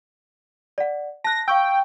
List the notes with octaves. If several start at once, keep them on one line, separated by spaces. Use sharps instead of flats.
D5 F#5
A5 F#6 A#6
F5 G5 C#6 E6